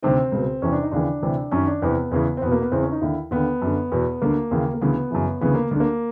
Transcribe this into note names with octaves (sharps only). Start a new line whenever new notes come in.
D2 C3 D#3 C4
C#2 B2
E2 C3 E3 C#4
D4
D#4
D#2 C#3 E3 D4
D2 C3 E3
F#2 D#3 C#4
D4
E2 C3 E3 B3
E2 C#3 E3
C4
E2 B2 B3
A#3
B3
E2 C#3 E3 C4
C#4
D#4
D#2 D3 E4
D#2 D3 B3
F#2 D3
E2 B2
D2 D3 A#3
D#2 C#3 E3
A#3
D2 C#3 E3 B3
F#2 C#3 E3
D2 C#3 E3 B3
A#3
D2 D3
A#3